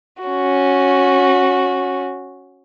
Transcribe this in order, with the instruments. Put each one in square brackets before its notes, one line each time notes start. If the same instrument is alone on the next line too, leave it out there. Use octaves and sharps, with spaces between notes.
[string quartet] C#4 F#4